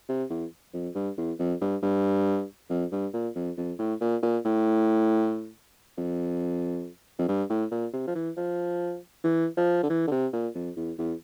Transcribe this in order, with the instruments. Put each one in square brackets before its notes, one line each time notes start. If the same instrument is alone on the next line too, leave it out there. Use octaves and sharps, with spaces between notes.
[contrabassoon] C3
E2
F2
G2
E2
F2
G2
G2
F2
G2
A#2
F2
F2
A2
A#2
A#2
A2
F2
F2
G2
A2
A#2
C3
F3
E3
F3
E3
F3
D3
E3
D3
C3
A#2
F2
E2
E2